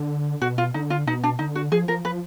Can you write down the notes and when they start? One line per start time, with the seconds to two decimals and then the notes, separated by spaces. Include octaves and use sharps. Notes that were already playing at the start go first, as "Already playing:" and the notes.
Already playing: D3
0.41 B2 F#4
0.58 F4
0.74 D3 D#4
0.90 F4
1.06 B2 D#4
1.24 D4
1.39 D3 D#4
1.55 F#4
1.72 F3 G#4
1.88 F3 A#4
2.05 F3 B4